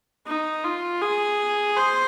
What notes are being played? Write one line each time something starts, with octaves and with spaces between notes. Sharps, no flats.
D#4
F4
G#4
C5